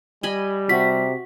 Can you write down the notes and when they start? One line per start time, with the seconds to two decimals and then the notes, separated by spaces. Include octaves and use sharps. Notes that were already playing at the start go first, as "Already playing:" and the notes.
0.23 G3 D#5 G#5 B5
0.69 C3 F#4 B6